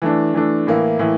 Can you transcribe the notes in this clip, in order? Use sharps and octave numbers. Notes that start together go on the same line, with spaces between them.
E3 A3 D4
E3 A3 D4
A2 E3 A#3 E4
A2 E3 A#3 E4